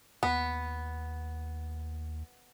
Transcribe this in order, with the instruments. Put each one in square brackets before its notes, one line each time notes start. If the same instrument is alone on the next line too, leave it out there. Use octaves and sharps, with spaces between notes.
[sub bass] D#2 [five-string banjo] B3